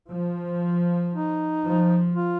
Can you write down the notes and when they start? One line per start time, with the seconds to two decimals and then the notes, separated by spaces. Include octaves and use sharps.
0.12 F3
1.14 D#4
1.65 F3
2.15 F4